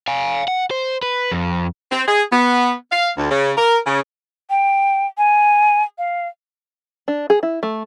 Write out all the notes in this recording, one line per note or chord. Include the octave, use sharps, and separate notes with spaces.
F5 G#5
F#5
C5
B4
F2
C4
G#4
B3
F5
D2
C#3
A#4
C#3
G5
G#5
F5
D4
G#4
E4
A3